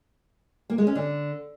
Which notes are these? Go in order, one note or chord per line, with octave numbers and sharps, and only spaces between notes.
A#3
G#3
C#4
D3